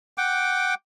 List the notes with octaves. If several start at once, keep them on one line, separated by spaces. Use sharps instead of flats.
F#5 G5 D6